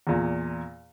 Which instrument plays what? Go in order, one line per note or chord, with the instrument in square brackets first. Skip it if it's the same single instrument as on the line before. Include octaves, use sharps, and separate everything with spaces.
[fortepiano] E2 A#2